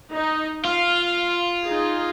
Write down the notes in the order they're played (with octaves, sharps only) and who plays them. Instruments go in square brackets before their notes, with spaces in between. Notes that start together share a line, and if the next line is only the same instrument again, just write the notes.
[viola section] D#4
[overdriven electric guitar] F4 [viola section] F5
[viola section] D#4 G#4